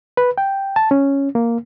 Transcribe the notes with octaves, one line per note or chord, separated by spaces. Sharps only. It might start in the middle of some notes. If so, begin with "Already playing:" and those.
B4
G5
A5
C#4
A#3